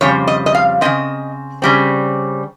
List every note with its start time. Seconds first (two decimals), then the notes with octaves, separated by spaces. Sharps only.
0.01 F2 C#3 G3 C4 C#5
0.27 D#5
0.46 D#5
0.55 F5
0.81 C#3 G#3 C4 D#5
1.62 C#3 G3 C4